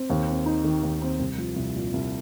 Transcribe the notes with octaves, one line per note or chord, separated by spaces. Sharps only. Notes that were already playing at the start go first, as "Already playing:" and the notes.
Already playing: C4
D#2
C4
D#4
D#3
D#2
C4
C2
F3
C2
A#2
C2